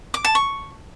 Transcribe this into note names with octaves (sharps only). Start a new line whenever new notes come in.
D6
A5
C#6